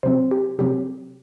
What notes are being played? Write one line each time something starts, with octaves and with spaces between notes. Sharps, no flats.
C3 F#3 C4 C5
G4
C3 F#3 C4 G4